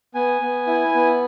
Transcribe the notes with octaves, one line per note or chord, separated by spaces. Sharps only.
B3 G#5
B3
E4
B3